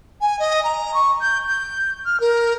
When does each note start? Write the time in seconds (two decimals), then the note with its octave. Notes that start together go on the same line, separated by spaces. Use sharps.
0.21 G#5
0.39 D#5
0.64 A#5
0.94 C#6
1.21 G6
1.48 G6
2.06 F6
2.20 A#4